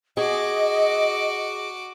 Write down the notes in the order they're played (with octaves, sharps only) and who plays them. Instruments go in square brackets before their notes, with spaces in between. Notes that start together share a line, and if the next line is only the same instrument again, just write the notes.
[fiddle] F#4 D6 [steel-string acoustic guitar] G#4 [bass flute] D#5